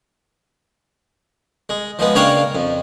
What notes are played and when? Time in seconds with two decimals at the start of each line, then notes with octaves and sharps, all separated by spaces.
1.69 G#3
1.99 F3 G#3 B3
2.15 C#3 A#3 D4 C#5 F5 G5
2.55 F2